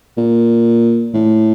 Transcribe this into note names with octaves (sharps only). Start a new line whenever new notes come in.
A#2
A2